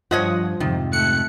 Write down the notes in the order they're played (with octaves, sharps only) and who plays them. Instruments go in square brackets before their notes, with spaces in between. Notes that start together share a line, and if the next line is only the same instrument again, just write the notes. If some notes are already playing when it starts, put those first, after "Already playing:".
[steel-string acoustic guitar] G2 [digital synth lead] F3 [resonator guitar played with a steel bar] C#5 D#5 F#5
[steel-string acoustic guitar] F2 G#2 C3 [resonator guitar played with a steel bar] D#3
[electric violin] A3 F#6 [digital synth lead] C#7